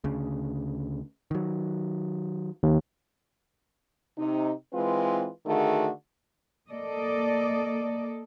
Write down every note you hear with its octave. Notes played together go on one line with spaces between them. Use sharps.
D2 C#3
D#3 F#3
D#2
C3 D#4
E3 G#3 C4 F4 B4
D3 D#3 A3 F#4 G#4
A#3 A4 D5 D#5